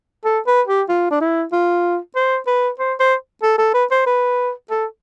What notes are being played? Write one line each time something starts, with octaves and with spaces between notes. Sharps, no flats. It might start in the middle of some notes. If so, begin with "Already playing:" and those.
A4
B4
G4
F4
D4
E4
F4
C5
B4
C5
C5
A4
A4
B4
C5
B4
A4